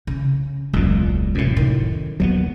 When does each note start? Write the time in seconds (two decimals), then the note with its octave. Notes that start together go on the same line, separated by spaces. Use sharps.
0.07 C#3
0.73 E1 C#2 A#2 F#3
1.35 F#2 A2 C3 E3
1.57 D#3
2.20 A#1 D#2 F#3 G3 B3